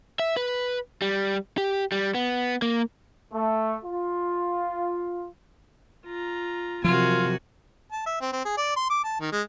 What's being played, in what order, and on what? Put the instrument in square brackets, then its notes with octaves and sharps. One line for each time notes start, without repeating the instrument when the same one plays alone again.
[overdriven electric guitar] E5
B4
G3
G4
G3
B3
A#3
[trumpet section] A3
F4
[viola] F4 A#5
[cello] C3 F#4 [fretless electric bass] F3 F#3 [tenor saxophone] F4 [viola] A#4 G#5
[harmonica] A5
E5
C4
C4
G#4
D5
C6
D6
A5
D#3
G#3